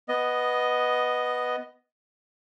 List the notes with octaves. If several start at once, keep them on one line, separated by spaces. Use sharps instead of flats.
B3 D#5